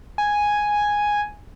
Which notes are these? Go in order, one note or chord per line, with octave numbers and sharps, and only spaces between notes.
G#5